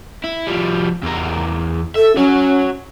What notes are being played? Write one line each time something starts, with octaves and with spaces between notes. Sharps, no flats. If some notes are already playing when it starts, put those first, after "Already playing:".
E4
F3 G3
E2 A#4
A4 E5
C#4 F#4 C#5